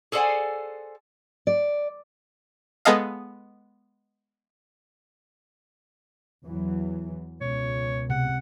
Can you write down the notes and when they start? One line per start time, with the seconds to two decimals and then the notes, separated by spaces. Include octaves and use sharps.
0.12 G#4 A4 C5 D5 F#5 G#5
1.47 D5
2.85 G#3 B3 G#4 A4 D#5 F5
6.43 E2 E3 F#3
7.41 C#2 B2 C#5
8.10 C3 F#5